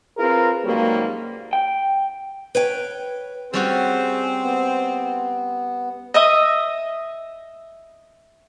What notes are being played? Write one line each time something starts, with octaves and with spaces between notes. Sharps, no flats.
C4 F4 G#4 A#4 B4
G#2 C#3 F#3 G3 A#3
G5
B4 C#5 G5
G3 C4 C#4 F#4 G#4
B3
D#5 E5 D#6